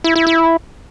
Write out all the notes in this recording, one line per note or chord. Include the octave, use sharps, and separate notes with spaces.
E4
E4
E4